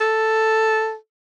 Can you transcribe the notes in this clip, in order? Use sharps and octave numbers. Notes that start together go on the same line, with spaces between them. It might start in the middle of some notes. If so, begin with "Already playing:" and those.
A4